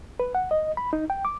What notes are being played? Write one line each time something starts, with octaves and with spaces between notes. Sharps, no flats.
B4
F#5
D#5
B5
D#4
G5
D6